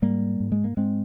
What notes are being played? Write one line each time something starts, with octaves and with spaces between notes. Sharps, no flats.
G#2 G3 A#3
G#2
G#3
A#3
G#2 G#3 C4